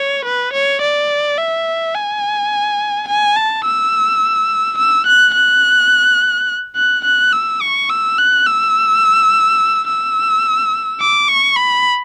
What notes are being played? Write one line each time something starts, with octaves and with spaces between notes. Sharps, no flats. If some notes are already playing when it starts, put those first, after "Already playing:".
Already playing: C#5
B4
C#5
D5
E5
G#5
G#5
A5
E6
E6
F#6
F#6
F#6
F#6
E6
C#6
E6
F#6
E6
E6
D6
C#6
B5